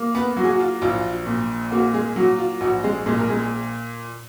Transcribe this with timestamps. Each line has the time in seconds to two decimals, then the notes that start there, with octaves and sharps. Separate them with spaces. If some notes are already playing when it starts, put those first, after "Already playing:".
Already playing: A#3
0.15 B3 B4
0.36 F#3 F#4
0.44 G#4
0.51 F#4
0.60 F4
0.81 A#1 F4
1.26 A#2
1.71 A#3 F#4
1.93 G#3 G#4
2.16 F#3 F#4
2.38 F4
2.61 A#1 F#4
2.83 G#3 G#4
3.06 A#2 G#3 G#4
3.19 A#4
3.29 G#3 G#4